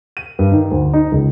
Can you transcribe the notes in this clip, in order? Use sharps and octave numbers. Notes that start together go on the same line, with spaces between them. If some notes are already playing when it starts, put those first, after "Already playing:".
D#7
G2
D#3
D2
D#4
C#2